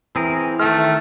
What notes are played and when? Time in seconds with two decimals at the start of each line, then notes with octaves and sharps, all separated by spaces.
0.16 E3 C4 G#4 A#4
0.60 D#3 A3 G5 F6